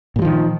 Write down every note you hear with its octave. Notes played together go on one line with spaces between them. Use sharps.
A#2 D#3 F3 G3